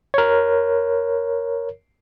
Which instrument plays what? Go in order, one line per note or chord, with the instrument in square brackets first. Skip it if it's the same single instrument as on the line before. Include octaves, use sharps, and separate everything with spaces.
[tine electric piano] A#4 C#5